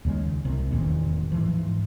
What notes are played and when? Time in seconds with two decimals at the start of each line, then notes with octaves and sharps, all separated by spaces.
0.05 D#2 C#3 G#3
0.45 C2 C3
0.71 E1 A1 D#2 A#2
1.32 G#2 E3 F3